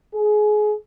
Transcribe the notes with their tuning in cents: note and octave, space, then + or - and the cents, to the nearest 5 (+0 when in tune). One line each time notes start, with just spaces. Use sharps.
G#4 +25